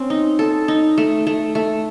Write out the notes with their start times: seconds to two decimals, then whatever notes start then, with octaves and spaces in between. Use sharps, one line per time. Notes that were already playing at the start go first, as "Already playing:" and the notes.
Already playing: C4 C#4
0.10 D#4
0.39 A4
0.68 D#4
0.98 A3
1.27 A3
1.55 A3